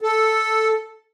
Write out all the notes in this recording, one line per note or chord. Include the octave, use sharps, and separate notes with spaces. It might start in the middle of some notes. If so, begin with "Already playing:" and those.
A4